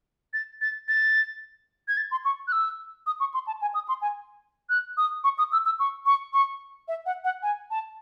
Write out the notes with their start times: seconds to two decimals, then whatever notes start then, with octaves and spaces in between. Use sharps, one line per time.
0.34 A6
0.61 A6
0.88 A6
1.88 G#6
1.97 A6
2.11 C6
2.25 C#6
2.48 F#6
2.52 E6
3.07 D#6
3.20 C#6
3.34 C6
3.47 A5
3.62 G#5
3.74 D#6
3.88 C6
4.02 G#5
4.70 F#6
4.97 D#6
5.24 C#6
5.38 D#6
5.53 E6
5.65 E6
5.80 C#6
6.06 C#6
6.34 C#6
6.88 E5
7.06 F#5
7.24 F#5
7.43 G#5
7.71 A5